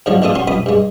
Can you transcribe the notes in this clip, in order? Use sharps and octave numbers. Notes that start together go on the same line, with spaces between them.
G#2 D3 F3 F#3
A1 B2 D4 F4 A4 D#6
C#4 F#4 C6
F2 B2 B5 D#6
G2 G#3